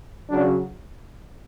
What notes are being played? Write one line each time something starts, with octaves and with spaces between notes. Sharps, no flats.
C#3 F#3 D4